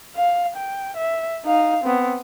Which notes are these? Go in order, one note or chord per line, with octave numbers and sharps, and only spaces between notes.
F5
G5
E5
D#4 F5
B3 C4